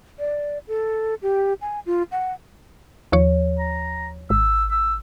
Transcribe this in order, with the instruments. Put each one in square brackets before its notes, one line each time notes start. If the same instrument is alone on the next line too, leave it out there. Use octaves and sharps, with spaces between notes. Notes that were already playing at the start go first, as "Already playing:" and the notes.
[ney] D5
A4
G4
G#5
F4
F#5
[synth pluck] D#2 F3 C#5
[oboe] A#5
[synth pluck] G#1 [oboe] E6
[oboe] E6